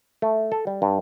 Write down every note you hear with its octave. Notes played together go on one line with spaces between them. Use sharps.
A3
A4
G3
G2